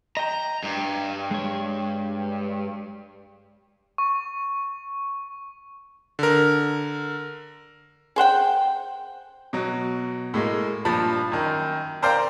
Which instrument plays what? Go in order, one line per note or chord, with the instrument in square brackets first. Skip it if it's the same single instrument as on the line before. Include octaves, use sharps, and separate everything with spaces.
[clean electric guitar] D#5 G5 [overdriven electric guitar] A#5
[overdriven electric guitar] G2
[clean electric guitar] G#3 C#5
[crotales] C#6
[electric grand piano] D3 A#4
[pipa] G#4 C5 F#5 G5
[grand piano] B2 F#3
A2 G#3 A#3
G2 A#2 F3 A5 B5
F#2 D#3
A#4 C5 D5 F5 G5 A#5